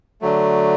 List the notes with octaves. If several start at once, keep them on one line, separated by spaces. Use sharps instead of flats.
D3 F#3 A3